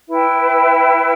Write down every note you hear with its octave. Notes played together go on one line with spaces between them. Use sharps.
E4 B4 E5 G5